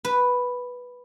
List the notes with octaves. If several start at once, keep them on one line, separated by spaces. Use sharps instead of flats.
B4